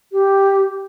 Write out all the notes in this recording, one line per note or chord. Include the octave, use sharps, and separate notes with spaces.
G4